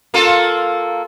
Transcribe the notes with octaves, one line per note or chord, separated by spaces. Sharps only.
A#3 F4 A4